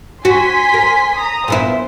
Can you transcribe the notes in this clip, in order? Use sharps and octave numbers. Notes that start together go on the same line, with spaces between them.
F#4 G#5 C6 B6
A#4
A#5 D#6
A#2 B3 E4 C5